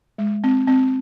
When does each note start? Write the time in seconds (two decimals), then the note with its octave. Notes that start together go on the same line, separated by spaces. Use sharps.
0.18 G#3
0.44 C4
0.68 C4